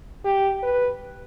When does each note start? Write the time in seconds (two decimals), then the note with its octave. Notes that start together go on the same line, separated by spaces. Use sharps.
0.25 G4
0.63 B4